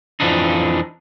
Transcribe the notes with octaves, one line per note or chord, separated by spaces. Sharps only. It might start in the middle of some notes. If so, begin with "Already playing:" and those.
F2 C3 E3 F3 D4 D#4